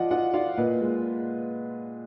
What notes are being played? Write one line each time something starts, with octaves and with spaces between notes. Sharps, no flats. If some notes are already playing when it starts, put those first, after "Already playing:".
Already playing: F3 F4 D5 D#5 F#5
F4 D#5 F#5
F4 D5 F5
A#2 B4 D#5
G#3